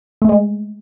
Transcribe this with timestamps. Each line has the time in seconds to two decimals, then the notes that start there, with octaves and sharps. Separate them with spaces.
0.22 A3
0.29 G#3